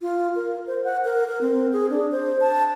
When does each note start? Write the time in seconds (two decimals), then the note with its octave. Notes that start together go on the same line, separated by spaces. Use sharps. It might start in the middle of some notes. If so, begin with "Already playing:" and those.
0.02 F4
0.36 A#4
0.67 C5
0.84 F#5
1.04 A#4
1.28 A#4
1.41 C4
1.73 G#4
1.90 D4
2.12 C5
2.41 A5